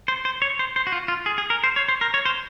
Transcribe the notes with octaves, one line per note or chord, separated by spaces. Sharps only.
C5
C5
C#5
C5
C5
F#4
F4
F4
G#4
G#4
A#4
C5
C#5
C5
A#4
C#5
C5